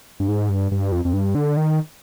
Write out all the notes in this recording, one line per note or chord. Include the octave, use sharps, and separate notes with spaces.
G2
G#2
G2
G2
F2
F2
G2
D3
D#3